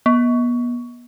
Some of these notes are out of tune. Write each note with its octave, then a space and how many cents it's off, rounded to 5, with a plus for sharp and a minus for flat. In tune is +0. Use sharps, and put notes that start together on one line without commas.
B3 -35